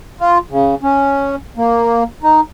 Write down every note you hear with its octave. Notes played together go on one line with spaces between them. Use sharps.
F4
C#3
C#4
A#3
D#4